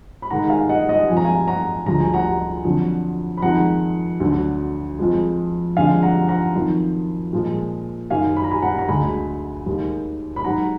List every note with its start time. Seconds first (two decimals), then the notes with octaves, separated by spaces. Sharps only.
0.22 B5
0.30 G#2 D#3 G#3 F#5 A#5
0.50 F5 G#5
0.69 D#5 F#5
0.89 D#5 F#5
1.09 F2 F3 G#3 G#5
1.17 A#5
1.25 F5 G#5
1.47 F#5 A#5
1.86 D2 D3 F3 G#3 A#5
2.00 G#5
2.14 F#5 A#5
2.64 F2 D3 F#3
3.37 B5
3.42 F2 D#3 G#3 F#5 A#5
4.20 D2 D3 F#3
4.99 F2 F3 G#3
5.77 F2 D3 F3 G#3 F5 G#5
6.03 F#5 A#5
6.28 F#5 A#5
6.55 F2 D#3 F#3
7.33 A#2 F3 G#3
8.10 F#2 D#3 F#3 F5 G#5
8.36 B5
8.44 A#5
8.51 G#5 B5
8.62 F#5 A#5
8.78 A#5
8.88 D2 D3 G#3 G#5 B5
9.66 D#2 D#3 G#3
10.36 B5
10.44 G#2 F#3 F#5 A#5